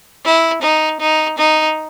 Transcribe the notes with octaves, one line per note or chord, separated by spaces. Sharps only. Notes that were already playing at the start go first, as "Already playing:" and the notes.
E4
D#4
D#4
D#4